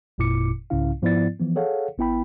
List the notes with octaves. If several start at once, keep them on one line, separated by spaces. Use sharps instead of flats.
G1 F2 A#2 E4 D6 C#7
C2 G#2 C#3 C#4 E4 F5
G#2 F3 B3 E4 D5 A6
E3 F3 B3
G#4 A4 C#5 F5 F#5
G#1 B3 E4 G5 B5